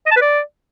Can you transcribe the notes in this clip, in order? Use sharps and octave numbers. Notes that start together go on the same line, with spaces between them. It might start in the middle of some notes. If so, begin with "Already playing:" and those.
D#5
A5
B4
D5